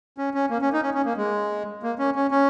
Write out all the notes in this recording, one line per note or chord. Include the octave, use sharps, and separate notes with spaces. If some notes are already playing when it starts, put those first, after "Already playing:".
C#4
C#4
A#3
C#4
D#4
C#4
C#4
A#3
G#3
A#3
C#4
C#4
C#4